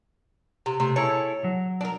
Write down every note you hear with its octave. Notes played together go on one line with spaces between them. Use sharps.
C3
C3 A3
E4 G#4 A4 C#5
F#3
D4 A#4